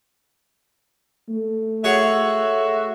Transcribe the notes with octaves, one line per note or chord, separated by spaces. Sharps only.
A3
F#4 G#4 C#5 E5 F#5